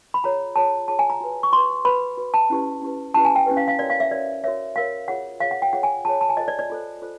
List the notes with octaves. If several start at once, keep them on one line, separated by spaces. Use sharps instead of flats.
B5
F4 G#4 C#5 A#5
F4 G#4 C#5 A5
F4 G#4 C#5 A5
G#5
A#5
F#4 B4
C#6
F#4 B4 C6
F#4 B4 B5
F#4 B4
A5
C#4 E4 G4 B4
C#4 E4 G4 B4
C#4 E4 G4 B4 A5
G#5
G5
C#4 E4 G4 B4
F5
F5
F#4 A#4 C#5 D5
F5
E5
F#4 A#4 C#5 D5
F#4 A#4 C#5 E5
F#4 A#4 C#5 F5
F4 G#4 C#5 F#5
F4 G#4 C#5 F5
F#5
G5
F4 G#4 C#5 F#5
G#5
F4 G#4 C#5 A5
A5
G#5
F4 A4 C5 D#5
D5
D5
F4 A4 C5
F4 A4 C5